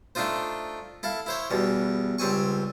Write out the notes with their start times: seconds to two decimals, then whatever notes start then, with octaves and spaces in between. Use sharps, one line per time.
0.15 A3 D4 D#4 F4 C5
1.03 E4 A4 F5
1.26 E4 C5 C#5
1.50 E2 B2 G3
2.18 C#2 G3 C4 G#5 C#6